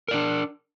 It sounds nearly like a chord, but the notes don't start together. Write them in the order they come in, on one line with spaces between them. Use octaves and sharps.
A#4 D5 D4